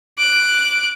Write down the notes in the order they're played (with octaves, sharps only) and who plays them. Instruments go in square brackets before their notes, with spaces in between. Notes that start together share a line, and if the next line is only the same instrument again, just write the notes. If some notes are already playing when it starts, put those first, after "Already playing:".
[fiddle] D6 F#6